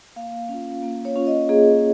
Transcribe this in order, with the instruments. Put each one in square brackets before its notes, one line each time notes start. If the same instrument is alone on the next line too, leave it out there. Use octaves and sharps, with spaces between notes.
[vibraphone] A#3 F5
C#4
F4
A#3
C#5
C#4 F4
D#5
A#3 G#4